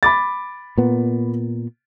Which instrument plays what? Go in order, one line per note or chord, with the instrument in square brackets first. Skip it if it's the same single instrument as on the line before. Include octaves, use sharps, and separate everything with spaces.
[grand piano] B5 D6 A6
[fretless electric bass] A#2 B3